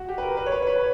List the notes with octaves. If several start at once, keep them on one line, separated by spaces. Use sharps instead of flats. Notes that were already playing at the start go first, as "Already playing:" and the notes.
Already playing: F#4
G4
B4
A#4
B4
C#5
B4
C#5
B4